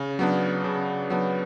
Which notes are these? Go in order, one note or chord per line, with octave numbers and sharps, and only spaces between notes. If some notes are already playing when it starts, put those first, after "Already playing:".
Already playing: C#3
F#3 B3 D4
C#3
F#3 B3 D4